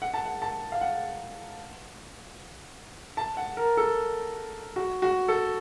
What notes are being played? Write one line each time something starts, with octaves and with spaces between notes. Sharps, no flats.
F#5
A5
F#5
A5
F5
F#5
A5
F#5
A#4
A4
F#4
F#4
A4